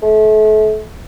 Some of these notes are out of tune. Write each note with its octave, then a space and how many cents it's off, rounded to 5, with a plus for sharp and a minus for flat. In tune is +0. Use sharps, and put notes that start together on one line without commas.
A3 -35